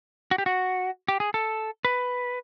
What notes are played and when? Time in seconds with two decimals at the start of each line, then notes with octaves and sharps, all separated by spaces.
0.31 F#4
0.38 G4
0.46 F#4
1.08 G4
1.20 G#4
1.34 A4
1.85 B4